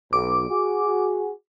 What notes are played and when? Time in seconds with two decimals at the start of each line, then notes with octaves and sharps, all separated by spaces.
0.13 B1 D6
0.49 F#4 G#4